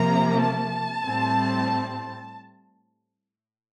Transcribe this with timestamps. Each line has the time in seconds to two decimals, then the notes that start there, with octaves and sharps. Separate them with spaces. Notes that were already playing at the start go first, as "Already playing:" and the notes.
Already playing: C3 F3 A#3 A#5
0.39 A5
1.04 A2 G3 C4